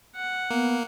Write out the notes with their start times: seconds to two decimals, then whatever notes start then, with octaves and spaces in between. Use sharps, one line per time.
0.16 F#5
0.51 A#3 B3